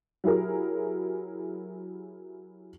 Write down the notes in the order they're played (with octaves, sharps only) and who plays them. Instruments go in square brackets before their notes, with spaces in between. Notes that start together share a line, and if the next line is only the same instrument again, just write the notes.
[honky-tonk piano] F#3 E4 G4 G#4 A#4